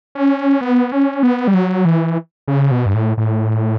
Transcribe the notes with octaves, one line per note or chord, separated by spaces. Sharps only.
C#4
B3
C#4
B3
G3
F#3
E3
C#3
B2
G2
A2
A2